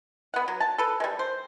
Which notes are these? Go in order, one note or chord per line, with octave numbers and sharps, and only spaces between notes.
B3 F#5
F#3
A5
A4 B4
G3 G#3
C5